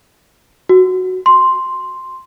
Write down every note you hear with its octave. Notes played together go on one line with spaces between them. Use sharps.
F#4
C6